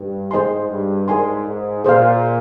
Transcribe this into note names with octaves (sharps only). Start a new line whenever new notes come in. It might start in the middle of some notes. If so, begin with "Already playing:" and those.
Already playing: G2
G#2 G#4 C5 D#5 G#5 C6
G2
G#2 A#4 D5 G#5 C6
G#2
A#2 G#4 C5 F5